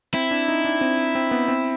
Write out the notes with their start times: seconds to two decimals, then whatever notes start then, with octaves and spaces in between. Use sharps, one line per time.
0.14 C4 E4
0.31 D4
0.48 D#4
0.65 D4
0.81 C4
1.15 C4
1.31 B3
1.48 C4